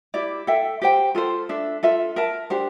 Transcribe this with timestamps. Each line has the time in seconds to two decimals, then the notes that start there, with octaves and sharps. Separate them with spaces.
0.14 E4 G4 D5
0.47 A4 E5 G5
0.82 G4 C5 G5
1.15 F4 A4 C5
1.49 D4 A4 E5
1.83 F4 A4 E5
2.16 A#4 E5 A5
2.50 D4 G4 C5